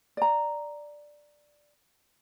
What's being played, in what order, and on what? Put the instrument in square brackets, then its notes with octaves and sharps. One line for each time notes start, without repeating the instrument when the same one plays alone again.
[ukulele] D5 A#5